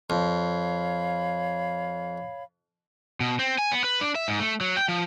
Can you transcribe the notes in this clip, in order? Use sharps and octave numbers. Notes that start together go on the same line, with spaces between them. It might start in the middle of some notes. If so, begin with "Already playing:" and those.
F2 C#5 F5 B5
B2
C4
G#5
B3
B4
D4
E5
G#2
A3
F#3
G5
F3